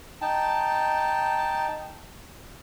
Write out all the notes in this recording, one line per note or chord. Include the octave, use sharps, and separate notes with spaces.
D#4 G5 A5